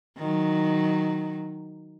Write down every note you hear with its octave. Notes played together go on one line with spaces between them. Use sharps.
D#3 F#3